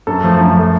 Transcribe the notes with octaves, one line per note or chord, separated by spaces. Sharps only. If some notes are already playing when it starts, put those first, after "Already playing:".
F#2 A4
F3 A3
F#2
F3 A3